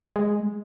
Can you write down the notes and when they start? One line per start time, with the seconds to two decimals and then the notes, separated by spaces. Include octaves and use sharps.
0.16 G#3